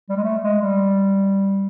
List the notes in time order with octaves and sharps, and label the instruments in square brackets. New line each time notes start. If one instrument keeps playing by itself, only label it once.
[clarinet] G3
G#3
A3
G#3
G3